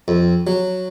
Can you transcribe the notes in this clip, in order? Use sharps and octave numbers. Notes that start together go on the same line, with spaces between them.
F2
F#3